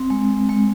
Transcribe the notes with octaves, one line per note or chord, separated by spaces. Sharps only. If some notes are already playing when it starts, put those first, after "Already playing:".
Already playing: C4
G#3
G#3